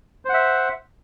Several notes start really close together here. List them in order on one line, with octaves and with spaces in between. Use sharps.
C5 F#5 E5